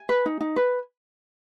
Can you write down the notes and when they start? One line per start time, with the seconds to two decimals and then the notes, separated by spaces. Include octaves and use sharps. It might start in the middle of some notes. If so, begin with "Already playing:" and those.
Already playing: G#5
0.09 B4
0.26 D#4
0.41 D#4
0.56 B4